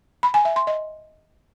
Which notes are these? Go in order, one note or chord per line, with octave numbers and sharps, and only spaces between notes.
B5
G#5
E5
C6
D#5